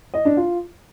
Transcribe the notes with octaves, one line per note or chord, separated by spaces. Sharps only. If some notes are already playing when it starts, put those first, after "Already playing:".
D#5
D4
F4